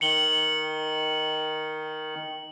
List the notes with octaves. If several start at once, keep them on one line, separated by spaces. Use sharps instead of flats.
D#3 C#7 F#7 G7